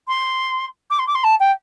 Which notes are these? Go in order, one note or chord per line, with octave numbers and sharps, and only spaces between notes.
C6
D6
C6
D6
C6
A5
G5